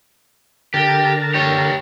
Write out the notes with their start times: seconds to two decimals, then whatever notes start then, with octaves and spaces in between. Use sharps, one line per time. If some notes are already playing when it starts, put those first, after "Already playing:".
0.74 D3 G4 A#4 A5
1.34 G4 C#5